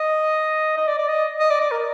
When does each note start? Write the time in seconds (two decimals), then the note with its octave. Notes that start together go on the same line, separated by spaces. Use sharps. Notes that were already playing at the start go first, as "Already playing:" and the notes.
Already playing: D#5
0.77 D#5
0.87 D5
0.98 D5
1.08 D#5
1.40 D#5
1.50 D5
1.61 D5
1.71 A#4